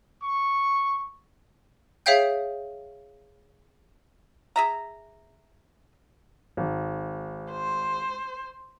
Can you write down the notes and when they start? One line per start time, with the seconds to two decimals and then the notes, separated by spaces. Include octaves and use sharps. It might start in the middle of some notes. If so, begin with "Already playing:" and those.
0.23 C#6
2.06 G#4 C#5 E5 F5 G5 G6
4.56 G#4 E5 A#5
6.57 G#1
7.52 C5